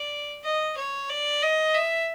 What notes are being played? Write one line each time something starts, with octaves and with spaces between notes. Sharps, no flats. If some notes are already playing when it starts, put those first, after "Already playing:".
Already playing: D5
D#5
C#5
D5
D#5
E5